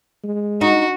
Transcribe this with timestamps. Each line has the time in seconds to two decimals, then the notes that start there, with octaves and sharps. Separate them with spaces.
0.23 G#3
0.61 D#4 F#4